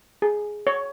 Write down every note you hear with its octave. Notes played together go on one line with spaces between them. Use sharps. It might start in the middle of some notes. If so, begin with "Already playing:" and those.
G#4
C#5